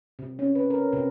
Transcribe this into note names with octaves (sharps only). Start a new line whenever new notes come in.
C3
C#4
B4
A#4
C3